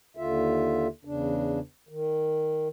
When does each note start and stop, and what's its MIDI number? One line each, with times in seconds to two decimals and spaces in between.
0.17 0.87 39
0.17 0.87 50
0.17 0.87 65
0.17 0.87 76
1.05 1.60 40
1.05 1.60 49
1.05 1.60 62
1.89 2.68 51